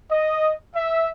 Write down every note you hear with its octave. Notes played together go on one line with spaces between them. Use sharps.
D#5
E5